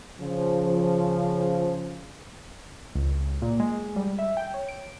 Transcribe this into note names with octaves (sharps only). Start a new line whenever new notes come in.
C#3 F3
C#2
A#2
G#3
G3
E5
G5
C#5
D7